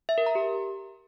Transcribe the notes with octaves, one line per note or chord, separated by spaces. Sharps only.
E5
A#4
A#5
G4